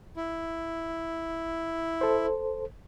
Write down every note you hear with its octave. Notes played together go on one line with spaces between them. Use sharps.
E4
A4 C5